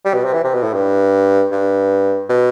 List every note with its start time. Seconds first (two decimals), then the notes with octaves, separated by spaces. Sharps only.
0.05 G3
0.14 B2
0.24 C3
0.34 E3
0.44 C3
0.54 B2
0.63 A2
0.73 G2
1.51 G2
2.29 B2